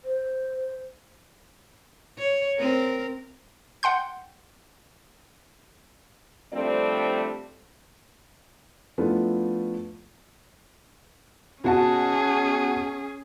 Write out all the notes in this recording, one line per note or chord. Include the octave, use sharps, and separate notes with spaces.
C5
C#5
C4 A#4
F#5 G5 C6 G6
F3 G3 A3 C4 D4 D5
F3 A3 B3 D4 E4 F4
B2 C#4 F#4 G#4 A5